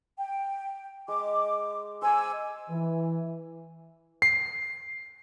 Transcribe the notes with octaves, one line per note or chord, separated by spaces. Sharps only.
G5
G#3 D6
C5 G#5 D6 E6
E3
C7